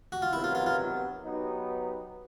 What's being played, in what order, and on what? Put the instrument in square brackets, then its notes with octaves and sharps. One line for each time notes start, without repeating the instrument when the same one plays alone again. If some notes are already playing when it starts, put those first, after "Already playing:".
[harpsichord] F#4
F4
[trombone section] C3 D#3 F#3 B3 [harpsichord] E4
[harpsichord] F4
F4
F4
[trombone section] F#3 B3 D#4 G4 B4